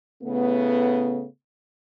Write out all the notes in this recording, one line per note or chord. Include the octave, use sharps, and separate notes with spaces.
A2 C#3 A3 B3